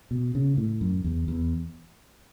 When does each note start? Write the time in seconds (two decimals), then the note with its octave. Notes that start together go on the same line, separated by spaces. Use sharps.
0.11 B2
0.35 C#3
0.57 A2
0.81 F#2
1.04 E2
1.28 E2